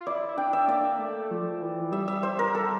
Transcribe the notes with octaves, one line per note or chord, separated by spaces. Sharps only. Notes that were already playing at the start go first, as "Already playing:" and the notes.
F4
E4 D5
E4
D4 G5
E5
A#3 D5
A3
F3
E3
G3 E5
E5
C5
A#4
A4